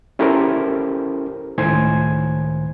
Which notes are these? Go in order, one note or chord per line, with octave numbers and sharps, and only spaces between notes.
C#4 E4 G4 A4 A#4 C5
C#2 A2 D#3 C5 G#5 G#6